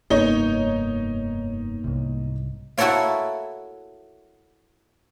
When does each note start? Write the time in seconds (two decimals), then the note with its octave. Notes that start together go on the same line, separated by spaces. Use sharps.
0.10 F1 G2 A#3 B3 D#4 C#5 D#5
1.84 C2 G#2 C3
2.78 E4 F#4 A4 A#4 C#5 F5